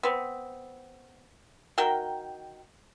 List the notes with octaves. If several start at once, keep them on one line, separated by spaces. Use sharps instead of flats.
B3 C4
D#3 F#4 A#4 G5